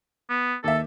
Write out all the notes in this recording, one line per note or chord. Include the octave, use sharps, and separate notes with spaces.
B3
D#2 A4 E5